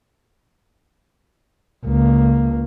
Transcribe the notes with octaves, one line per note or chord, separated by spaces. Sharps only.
C#2 A#3